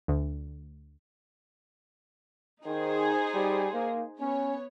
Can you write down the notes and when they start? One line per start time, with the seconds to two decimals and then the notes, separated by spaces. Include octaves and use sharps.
0.08 D2
2.66 D#3 D#4 G#4 C5
3.34 G3
3.73 A#3
4.20 B3 C#4 C#5